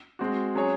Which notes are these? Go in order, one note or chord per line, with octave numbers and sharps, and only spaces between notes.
G#3 C4 F#4
F#3 C#4 G#4 C#5